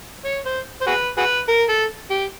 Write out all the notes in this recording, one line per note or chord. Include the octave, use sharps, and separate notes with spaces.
C#5
C5
C5
F#4 G#4 B4
F#4 G#4 B4
A#4
A4
G4